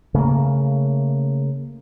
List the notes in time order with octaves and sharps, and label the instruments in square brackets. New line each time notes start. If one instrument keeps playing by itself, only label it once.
[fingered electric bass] C#3 A3 A#3